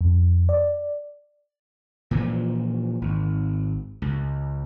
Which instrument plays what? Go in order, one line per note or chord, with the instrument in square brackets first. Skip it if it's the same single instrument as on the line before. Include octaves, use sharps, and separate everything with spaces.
[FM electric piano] F2
D5
[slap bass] A#2 E3 F3
G#1
C#2